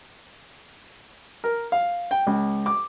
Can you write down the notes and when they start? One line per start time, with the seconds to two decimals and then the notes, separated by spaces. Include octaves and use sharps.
1.44 A#4
1.72 F5
2.11 G5
2.27 C#2
2.66 D6